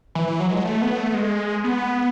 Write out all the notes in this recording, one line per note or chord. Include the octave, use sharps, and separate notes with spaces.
E3
E3
F#3
G#3
A3
B3
A3
G#3
B3